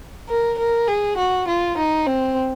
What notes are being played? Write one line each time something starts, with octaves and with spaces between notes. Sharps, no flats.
A#4
A#4
G#4
F#4
F4
D#4
C4